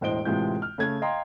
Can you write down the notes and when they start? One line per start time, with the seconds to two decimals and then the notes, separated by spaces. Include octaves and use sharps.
0.01 E1 A2 C5 D#5 D7 G7
0.25 A2 C3 E3 G#3 F4 G6
0.62 F6
0.78 C#3 A3 G#6
1.02 D#5 F5 G5 A#5 C6